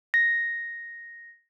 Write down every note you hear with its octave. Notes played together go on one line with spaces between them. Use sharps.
A#6